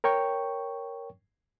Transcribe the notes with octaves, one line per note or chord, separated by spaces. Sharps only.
A#4 C#5 G5 C#6